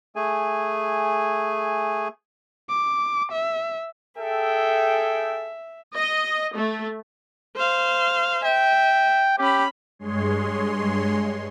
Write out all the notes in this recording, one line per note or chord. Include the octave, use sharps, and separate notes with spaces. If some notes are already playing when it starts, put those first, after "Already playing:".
A3 G#4 G#5
D6
E5
G#4 A4 E5 G5
D#5
A3
C5 F5
E5 G5
C#4 G4 B5
G2 G#3 G#4 C#5 C6